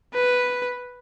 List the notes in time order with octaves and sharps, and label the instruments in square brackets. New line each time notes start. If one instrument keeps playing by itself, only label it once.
[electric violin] B4